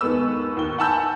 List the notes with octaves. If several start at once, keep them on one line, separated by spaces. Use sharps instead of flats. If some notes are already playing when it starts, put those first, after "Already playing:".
D#2 G#3 B3 A4 B4 E6
D#2 G5 G7
F#5 G#5 A5 B5 E6 G6